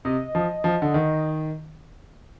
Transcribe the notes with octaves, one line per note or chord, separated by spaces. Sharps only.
C3 D#5
F3
F3
D3
D#3